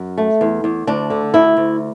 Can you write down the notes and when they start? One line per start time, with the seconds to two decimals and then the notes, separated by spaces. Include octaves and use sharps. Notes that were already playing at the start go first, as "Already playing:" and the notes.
Already playing: F#2
0.18 A3
0.41 E2
0.64 E2
0.87 D2 D4
1.10 D3
1.34 D2 E4
1.57 D2